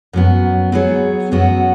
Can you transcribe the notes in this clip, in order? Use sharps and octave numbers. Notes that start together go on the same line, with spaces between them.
F#2 F#3 B3
F#3 B3 G#4 C#5
F#2 F#3 B3 F#4